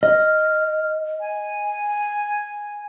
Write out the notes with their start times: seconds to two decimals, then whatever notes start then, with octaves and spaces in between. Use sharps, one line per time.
0.03 D#5 F6
1.20 G#5